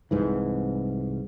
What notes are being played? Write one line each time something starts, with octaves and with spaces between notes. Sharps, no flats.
C2 G#2 E3